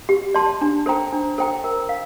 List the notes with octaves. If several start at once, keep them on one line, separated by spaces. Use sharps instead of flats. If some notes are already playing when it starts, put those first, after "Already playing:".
G4
D5 A5 C6
D4
A4 C5 G5 A#5
D4
A4 C5 G5 A#5
A#4
F5